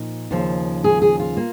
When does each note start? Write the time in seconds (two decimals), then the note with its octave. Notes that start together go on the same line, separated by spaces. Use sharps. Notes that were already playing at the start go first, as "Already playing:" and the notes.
Already playing: A#2 F3 D#4
0.31 D#2 C#3 F3
0.84 G#4
1.02 G#4
1.20 F4
1.37 A#3